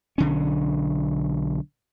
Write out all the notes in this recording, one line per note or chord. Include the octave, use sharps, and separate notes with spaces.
B1 D3 C#4